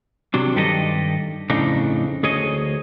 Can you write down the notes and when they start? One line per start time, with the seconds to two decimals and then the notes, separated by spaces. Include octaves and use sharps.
0.34 C3 F#3 D4
0.55 G2 D#3 G4 A4 A#4 D#5
1.50 F2 A2 C#3 D4 D#4
2.23 D2 G#4 C#5 D#5